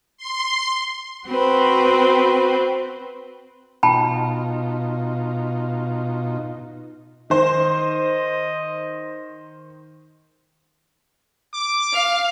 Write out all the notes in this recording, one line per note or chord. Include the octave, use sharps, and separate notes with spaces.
C6
C4 F#4 B4 C5
B2 D#4 F4 G5 A5 B5
D#3 C5 D#5
D6
F5